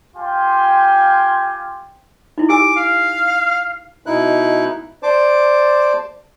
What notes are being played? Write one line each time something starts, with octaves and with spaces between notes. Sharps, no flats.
F4 G4 G5 G#5 C6
D#4 E4
G4 G#5 D6 E6
F5
B2 D#4 E4 F#6
C5 D5 A5 D6